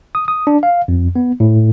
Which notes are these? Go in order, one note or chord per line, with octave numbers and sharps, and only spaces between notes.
D#6
D#6
D4
F5
F2
B3
A2